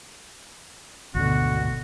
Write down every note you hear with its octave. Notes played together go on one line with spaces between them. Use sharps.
G#1 D2 B2 D3 F#4